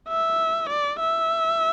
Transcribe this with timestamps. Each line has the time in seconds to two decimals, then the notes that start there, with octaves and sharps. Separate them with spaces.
0.08 E5
0.69 D5
1.00 E5